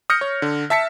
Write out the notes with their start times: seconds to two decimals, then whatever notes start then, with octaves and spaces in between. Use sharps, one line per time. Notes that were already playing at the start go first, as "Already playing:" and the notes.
0.10 D#6 F6 G6 A#6 C#7
0.21 C#5
0.42 D3
0.70 E5 A5 B6 C#7